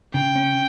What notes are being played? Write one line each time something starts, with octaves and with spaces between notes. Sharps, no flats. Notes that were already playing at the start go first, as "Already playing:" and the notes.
C#3 G5
C#4